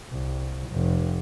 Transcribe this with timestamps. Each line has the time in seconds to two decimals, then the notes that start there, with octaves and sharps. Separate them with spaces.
0.12 C2
0.71 F1